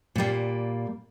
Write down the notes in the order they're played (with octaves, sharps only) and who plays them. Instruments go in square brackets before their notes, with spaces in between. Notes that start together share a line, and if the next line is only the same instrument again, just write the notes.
[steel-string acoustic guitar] A#2 G3 A#3